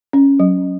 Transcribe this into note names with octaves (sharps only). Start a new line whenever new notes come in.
C#4
F#3